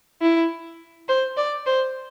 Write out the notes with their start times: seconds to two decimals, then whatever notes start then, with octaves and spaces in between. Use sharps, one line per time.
0.22 E4
1.09 C5
1.37 D5
1.66 C5